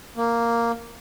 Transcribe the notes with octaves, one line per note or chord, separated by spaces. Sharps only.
A#3